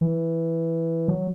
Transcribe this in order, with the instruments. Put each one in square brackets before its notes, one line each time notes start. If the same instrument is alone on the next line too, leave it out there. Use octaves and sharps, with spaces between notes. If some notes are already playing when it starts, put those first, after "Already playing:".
[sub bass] E3
F#3